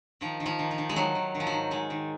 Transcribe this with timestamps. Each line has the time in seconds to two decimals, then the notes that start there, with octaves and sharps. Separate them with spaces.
0.21 D#3 F3
0.40 D#3
0.46 F3
0.59 D#3
0.71 F3
0.78 D#3
0.89 G#3
0.96 D#3 F#3
1.15 D#3
1.35 D#3
1.40 F3
1.47 F#3
1.53 G#2
1.71 G#2 G#3
1.90 D#3